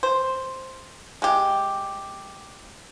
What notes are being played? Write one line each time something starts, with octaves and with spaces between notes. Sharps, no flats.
C5
G#3 G4